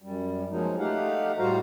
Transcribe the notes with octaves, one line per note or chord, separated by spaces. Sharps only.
F#2 G3
F3 F#3 G#3 A#3 D#4
A3 D#4 G4 F5 F#5
A2 G3 F#4 C5 F5 A#5